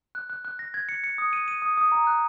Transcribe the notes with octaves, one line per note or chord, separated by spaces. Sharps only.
F#6
F#6
F#6
A#6
G#6
C#7
C#7
D#6
D#7
D#7
D#6
D#6
A#5
F#6